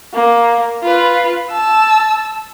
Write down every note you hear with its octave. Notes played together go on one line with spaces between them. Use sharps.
A#3
F4 B4
A5 E6